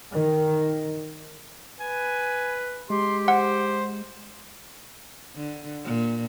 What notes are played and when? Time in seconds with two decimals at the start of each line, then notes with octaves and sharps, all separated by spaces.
0.12 D#3
1.80 B4 G#5
2.90 G#3 G4 C6
3.28 C5 F#5
5.35 D3
5.85 A#2